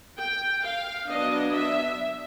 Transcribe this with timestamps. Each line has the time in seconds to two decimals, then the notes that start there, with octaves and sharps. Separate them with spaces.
0.18 G5
0.63 F5
1.08 F#3 B3 D4 D#5
1.53 E5